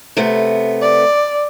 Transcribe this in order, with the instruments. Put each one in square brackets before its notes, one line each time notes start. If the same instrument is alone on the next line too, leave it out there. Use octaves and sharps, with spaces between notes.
[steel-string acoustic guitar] C3 A3 B3
[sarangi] D5